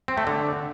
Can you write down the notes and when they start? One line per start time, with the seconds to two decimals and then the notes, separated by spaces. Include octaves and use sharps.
0.08 C4
0.18 A3
0.27 D3